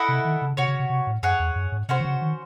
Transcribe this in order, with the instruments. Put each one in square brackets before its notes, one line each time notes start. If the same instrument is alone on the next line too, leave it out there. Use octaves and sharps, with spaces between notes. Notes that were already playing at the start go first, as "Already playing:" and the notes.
Already playing: [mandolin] E4 A4 D#5 F#5
[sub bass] C3
D#3
C#3
[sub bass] C3 [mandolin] C#4 F#4 C#5
[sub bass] C#3
C3
C3
A2
[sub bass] F#2 [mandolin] G#4 C#5 F#5
[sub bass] E2
F#2
G#2
[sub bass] C3 [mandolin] C#4 F#4 C5
[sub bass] D#3
C#3
D#3